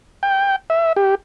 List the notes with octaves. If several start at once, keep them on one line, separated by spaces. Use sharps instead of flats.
G5
E5
G4